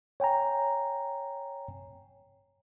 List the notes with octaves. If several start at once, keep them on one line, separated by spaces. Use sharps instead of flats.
C#5 G5 G#5 A#5